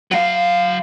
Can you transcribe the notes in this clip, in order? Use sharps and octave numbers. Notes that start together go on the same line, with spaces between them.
F#3 F5